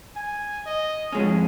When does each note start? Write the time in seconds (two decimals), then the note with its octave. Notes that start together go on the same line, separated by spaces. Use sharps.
0.16 G#5
0.66 D#5
1.12 F2 G#3 C#4 C#5